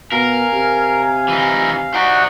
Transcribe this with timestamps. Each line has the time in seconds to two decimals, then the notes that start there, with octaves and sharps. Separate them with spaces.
0.12 B2 A#4 F5 G#5
0.52 C3
1.28 E3 D#4
1.94 D#4 F#4 C5 D5 F#5